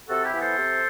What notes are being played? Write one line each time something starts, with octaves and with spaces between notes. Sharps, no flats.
C3 F#4 A4
E4 G4
E3 B3
A4 C5
C3